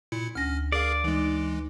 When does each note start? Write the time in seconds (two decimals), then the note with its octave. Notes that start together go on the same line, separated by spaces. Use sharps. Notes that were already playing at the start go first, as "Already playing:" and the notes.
0.12 A#2 E4 C#7
0.35 D2 C#4 F6 A#6
0.72 G#4 A#4 D5 F5
1.04 E3 G#3 D#4